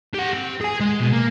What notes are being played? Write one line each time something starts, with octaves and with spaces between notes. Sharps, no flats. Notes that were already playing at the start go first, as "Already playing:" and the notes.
G4 F#5
C4
G#4 G#5
G#3
B2
A#3